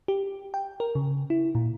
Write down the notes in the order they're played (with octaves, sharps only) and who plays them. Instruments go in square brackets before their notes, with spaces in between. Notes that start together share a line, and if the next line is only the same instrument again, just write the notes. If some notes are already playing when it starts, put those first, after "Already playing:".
[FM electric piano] G4
G5
A#4
C#3
E4
A#2